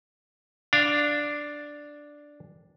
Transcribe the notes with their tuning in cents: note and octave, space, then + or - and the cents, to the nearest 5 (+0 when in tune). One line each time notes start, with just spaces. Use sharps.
D4 +0 F5 +0